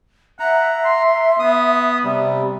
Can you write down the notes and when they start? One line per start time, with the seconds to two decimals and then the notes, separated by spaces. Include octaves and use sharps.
0.40 E5 F#5 A#5
0.85 C6
1.39 B3 D#6
2.04 C3 G3